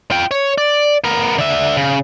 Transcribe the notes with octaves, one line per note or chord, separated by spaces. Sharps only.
F4 G5
C#5
D5
B3 A#4
D3 E5
C#3